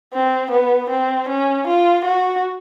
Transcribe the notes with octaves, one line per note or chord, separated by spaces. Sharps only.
C4
B3
C4
C#4
F4
F#4